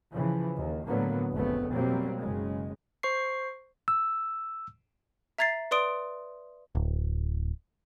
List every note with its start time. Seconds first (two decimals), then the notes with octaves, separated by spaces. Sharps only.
0.10 C#3 E3 F3
0.58 D#2
0.87 A2 D3 F#3 A#3 B3
1.33 F1 A#1 F2 C#3 A3 B3
1.71 B2 F#3 G3 A#3 C4
2.18 F#1 C#3 G#3
3.03 C5 C#6 C7
3.88 E6
5.38 E5 A#5 G#6 A6 C7
5.71 B4 D5 C6 D#6 D7
6.75 D1